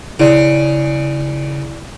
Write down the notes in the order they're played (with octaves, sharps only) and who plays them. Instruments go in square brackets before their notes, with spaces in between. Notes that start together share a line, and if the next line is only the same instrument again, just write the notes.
[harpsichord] C#3 [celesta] E4 D5